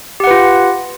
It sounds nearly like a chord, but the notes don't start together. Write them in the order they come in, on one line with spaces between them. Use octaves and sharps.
G4 F#5 B4 F4